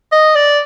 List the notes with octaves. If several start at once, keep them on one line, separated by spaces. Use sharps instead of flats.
D#5
D5